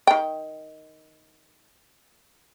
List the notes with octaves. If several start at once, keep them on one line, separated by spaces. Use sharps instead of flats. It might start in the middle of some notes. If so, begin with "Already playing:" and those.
D#3 G5